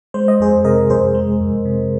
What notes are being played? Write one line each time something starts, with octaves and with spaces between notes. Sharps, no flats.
G#3 C5
D#5
F2 G#4 C5
C3 A#4 D#5
F2 G#4 C5
G#3
F2
C3